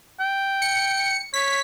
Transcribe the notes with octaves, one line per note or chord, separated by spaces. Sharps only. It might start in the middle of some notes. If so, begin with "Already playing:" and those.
G5
C#7
C#5 B6